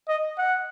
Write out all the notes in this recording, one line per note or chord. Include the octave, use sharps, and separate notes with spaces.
D#5
F#5